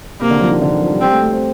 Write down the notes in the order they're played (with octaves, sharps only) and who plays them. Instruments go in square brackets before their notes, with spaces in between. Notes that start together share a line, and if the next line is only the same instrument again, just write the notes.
[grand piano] C3 [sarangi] A#3
[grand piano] D3
F3
D#3
D3
D#3
F3
G3
[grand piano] G3 [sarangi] C4
[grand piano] A3
A3
C4